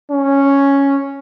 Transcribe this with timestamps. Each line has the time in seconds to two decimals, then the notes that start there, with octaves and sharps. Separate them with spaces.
0.11 C#4